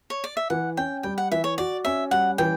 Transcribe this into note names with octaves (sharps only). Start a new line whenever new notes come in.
C#5
D5
E5
E3 F#5
C#4 G5
G3 G5
F#5
E3 E5
C#5
F#4 D5
C#4 E5
G3 F#5
E3 G5